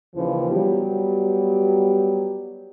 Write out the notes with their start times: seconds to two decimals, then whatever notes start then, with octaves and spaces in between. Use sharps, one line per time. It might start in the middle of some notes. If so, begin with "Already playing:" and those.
0.15 D#2 C#3 E3 F3
0.51 F#3 G3 B3 G4